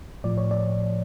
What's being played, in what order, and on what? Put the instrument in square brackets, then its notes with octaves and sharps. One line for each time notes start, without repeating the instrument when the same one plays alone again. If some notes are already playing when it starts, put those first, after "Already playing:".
[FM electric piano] A2 F3 D5
C#5
D5